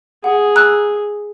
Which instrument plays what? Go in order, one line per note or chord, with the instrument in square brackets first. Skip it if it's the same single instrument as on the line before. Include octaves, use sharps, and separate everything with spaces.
[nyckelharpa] G#4 [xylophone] F#5
[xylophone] A#5 E6 F#6